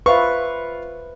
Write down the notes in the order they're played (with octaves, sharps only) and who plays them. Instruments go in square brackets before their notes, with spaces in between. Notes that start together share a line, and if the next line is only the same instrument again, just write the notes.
[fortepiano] F4 F5 C#6 [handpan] B4 C5 E5